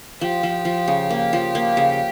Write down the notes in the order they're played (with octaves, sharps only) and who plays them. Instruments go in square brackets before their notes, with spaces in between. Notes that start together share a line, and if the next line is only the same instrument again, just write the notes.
[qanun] F3 [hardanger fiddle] G4
[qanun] F3
F3
C#3
A#3
F3
A#3
C#3